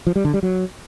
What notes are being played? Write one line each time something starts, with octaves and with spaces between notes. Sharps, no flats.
F3
G3
D3
G3
F#3